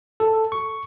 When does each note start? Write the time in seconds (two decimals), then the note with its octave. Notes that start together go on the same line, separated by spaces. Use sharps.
0.20 A4
0.52 C#6